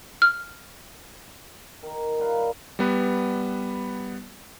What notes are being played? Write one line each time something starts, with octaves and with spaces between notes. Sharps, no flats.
F6
D#3
G3 D#4 B4 F5
G3 B3 B4